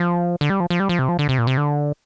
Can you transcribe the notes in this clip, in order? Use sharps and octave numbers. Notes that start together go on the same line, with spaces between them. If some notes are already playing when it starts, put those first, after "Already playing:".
Already playing: F3
D3
G3
F3
F3
G3
F3
C3
F3
D3
C3
A#2
C3
D3